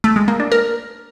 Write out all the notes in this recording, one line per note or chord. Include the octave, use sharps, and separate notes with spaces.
A3
G#3
A#3
D4
A#4